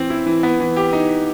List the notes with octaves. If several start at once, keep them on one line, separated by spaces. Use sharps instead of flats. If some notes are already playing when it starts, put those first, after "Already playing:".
Already playing: E3 C4
E4
E3
B3
E3
G4
D#4